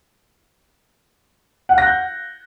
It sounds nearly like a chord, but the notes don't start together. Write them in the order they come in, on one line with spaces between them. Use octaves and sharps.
F#5 F5 A#6 F#6 G6